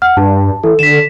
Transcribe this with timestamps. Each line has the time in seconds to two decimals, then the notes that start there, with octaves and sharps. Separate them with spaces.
0.02 F#5 F6
0.17 G2 A5
0.64 E3 A4
0.79 D3 B6 E7